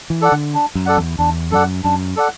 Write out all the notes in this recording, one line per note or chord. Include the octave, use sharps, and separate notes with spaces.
E3
A4 D5 F#5
D3
D4
F#2
A4 D5 F#5
E2
E2 D4
F#2 A4 D5 F#5
F#2 D4
A4 D5 F#5